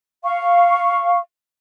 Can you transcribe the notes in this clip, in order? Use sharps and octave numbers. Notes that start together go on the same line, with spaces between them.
F5 C#6